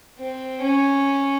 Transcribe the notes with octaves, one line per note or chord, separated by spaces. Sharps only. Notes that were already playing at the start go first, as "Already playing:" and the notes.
C4
C#4